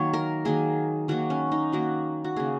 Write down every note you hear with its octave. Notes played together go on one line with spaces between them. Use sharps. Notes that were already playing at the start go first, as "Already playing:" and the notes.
Already playing: D#3 F#3 A#3 C#5
A#4
D#3 F#3 A#3 G#4
D#3 F#3 A#3 F#4
C#4
D#4
D#3 F#3 A#3 F#4
F#4
C#3 A#3 G#4